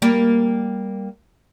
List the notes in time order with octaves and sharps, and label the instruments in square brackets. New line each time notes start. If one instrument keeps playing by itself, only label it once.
[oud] G3 A#3